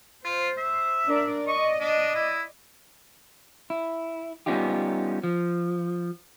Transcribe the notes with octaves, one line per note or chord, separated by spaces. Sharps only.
F4 C5
E5
D4 A#4 D5
D5 D#5 C#6
D4
E4
E4
G3 B3 C#4 D#4 F4 G4
F3